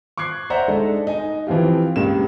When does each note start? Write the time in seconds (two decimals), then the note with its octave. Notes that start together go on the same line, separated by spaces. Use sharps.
0.17 C#6 D6 F#6 G#6 C7
0.50 C5 D5 E5 F#5 A#5
0.68 G#3 D4 D#4 A4
1.07 D#4 G#5
1.47 E3 F3 C4 F4 G4
1.96 C#2 G2 A#3 E7